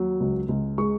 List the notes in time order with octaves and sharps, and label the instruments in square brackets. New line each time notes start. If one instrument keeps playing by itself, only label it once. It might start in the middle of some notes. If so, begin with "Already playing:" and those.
Already playing: [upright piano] D#2 F#3
C#2
C#2
G#3 C#6